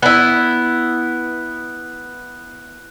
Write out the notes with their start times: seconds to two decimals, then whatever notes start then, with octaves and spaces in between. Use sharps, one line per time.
0.02 B3 E4 F#6